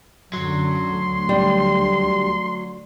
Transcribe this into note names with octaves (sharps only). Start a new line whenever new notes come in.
F#2 D3 F#3 C6
D2
G3